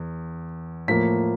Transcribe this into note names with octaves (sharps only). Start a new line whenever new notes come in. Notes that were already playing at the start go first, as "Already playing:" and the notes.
Already playing: E2
A2 F3 A#3 B6